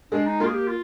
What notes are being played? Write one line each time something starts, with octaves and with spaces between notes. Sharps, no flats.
G#3 D4 G#4
D#4
A#3 F4 A#4
G#4
G4
F4